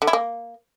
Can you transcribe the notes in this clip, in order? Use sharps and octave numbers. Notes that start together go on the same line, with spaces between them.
D3
E4
A#3